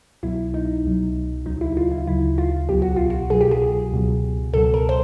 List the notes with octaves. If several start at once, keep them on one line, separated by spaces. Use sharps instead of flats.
C2 B2 F#3 E4
D#4
C2 B2 F#3
D2 C#3 F#3 D#4
E4
F4
E4
D2 C#3 F#3 E4
F4
C2 B2 F#3 G4
F#4
F4
F#4
C2 B2 F#3 G#4
G4
G#4
C#2 B2 F#3
C#2 B2 F#3 A4
A#4
C5